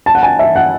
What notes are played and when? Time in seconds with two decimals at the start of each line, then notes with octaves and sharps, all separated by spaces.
0.06 A5
0.15 F#5
0.23 G#5
0.39 E5
0.56 F#5